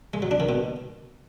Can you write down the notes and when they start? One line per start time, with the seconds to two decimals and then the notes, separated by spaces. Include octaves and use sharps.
0.14 G#3
0.22 F#3
0.31 D4
0.40 D#3
0.49 B2